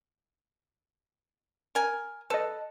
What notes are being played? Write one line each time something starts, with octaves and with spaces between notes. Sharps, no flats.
A#4 G#5
A4 B4 D#5